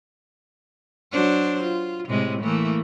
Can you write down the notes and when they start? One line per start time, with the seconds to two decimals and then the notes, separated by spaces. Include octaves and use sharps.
1.12 F#3 D4 C5
1.63 F4
2.08 A2 C3 G#3
2.42 E3 A3 A#3